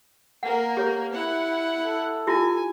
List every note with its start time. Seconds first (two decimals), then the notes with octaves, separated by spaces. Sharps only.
0.43 A#3 A#4 F#5
0.77 G4 C#5
1.13 E4 F#5
1.83 A4
2.27 E4 F4 G4 G#5